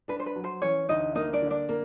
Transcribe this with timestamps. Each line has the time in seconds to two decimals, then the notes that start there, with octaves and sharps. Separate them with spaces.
0.08 D4 B4
0.19 C5
0.26 B4
0.36 F#3
0.44 C5
0.62 E3 C#4 C#5
0.89 D2 D#4 D#5
1.15 A#3 D#4 D#5
1.33 D4 D5
1.42 D3
1.50 D4 D5
1.69 A#3